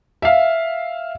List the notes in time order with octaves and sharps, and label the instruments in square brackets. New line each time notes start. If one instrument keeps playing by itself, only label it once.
[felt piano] E5 F5